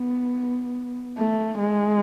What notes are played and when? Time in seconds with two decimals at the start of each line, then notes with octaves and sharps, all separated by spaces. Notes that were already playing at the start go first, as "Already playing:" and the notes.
Already playing: B3
1.18 A3
1.59 G#3